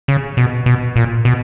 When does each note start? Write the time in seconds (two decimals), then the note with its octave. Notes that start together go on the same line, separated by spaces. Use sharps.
0.08 C#3
0.37 B2
0.66 B2
0.96 A#2
1.25 B2